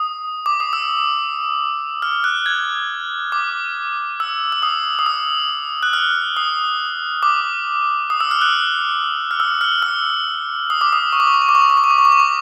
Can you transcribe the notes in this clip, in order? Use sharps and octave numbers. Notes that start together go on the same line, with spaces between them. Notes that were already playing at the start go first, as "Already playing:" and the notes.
Already playing: D#6
D6
D#6
E6
F6
F#6
G#6
D6
E6
E6
D#6
D#6
E6
F#6
F6
D#6
D6
D#6
E6
F6
F#6
F6
E6
F6
E6
D#6
D6
D#6
C#6
D6
C#6
D6
C#6
D6
C#6
D6
C#6
D6
C#6
D6
C#6
D6
C#6
D6